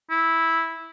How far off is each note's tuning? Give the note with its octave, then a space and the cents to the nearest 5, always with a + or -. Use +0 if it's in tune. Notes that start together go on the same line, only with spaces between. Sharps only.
E4 -5